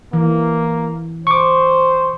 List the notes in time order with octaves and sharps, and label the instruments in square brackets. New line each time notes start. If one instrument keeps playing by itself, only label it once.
[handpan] E3 [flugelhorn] A#3
[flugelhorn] C5 [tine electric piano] C#6 D6